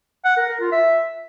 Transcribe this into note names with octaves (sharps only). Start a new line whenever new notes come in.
F#5
A#4
A#4
F4
E5